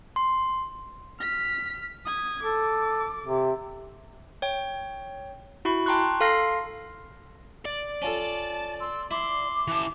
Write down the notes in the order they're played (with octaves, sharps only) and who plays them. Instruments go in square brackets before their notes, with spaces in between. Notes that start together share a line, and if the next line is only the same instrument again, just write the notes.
[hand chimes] C6
[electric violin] F6 B6
D#6 G#6
[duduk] A4 [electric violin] D6
[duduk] C3
[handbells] C#5 G5
E4 F#4 B5 C#6
G5 A5 A#5 C6 C#6 F#6
A4 F5 C6 F6 A#6 C7
[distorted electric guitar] D5
[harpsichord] C#4 F4 A4 [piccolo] A5
[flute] C6 [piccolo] E6
[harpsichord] E4 [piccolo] C6 [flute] D6
[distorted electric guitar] E3 A5